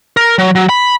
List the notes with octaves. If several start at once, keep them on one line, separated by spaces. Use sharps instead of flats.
A#4
F#3
F#3
B5